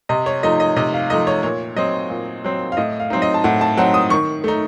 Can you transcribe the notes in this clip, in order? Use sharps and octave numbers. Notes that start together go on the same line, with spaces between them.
C3 D#5
C#5
F3 A3 D#4 D#5
D#5
C3 D#5
F5
F3 A3 D#4 D#5
C#5
A#2 C#5
F#3 C4 D#5
A#2
F#3 C4
F5
A2 D#5
F5
F#3 C4 D#4
D#5
A5
A2 F#5
A5
F#3 C4 D#4 F#5
D#6
D#3 C#6
A3 D#4